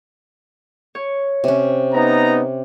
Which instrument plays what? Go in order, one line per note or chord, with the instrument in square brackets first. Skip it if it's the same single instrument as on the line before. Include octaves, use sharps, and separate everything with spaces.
[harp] C#5
[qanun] C3 C#4
[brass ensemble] B3 D#4 A#5